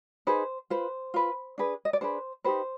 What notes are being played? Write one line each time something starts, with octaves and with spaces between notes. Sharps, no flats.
D#4 G#4 B4 C5
F4 B4 C5
F4 B4
D4 G#4 B4
D#5
D5
D4 G#4 B4 C5
D#4 G4 B4 C5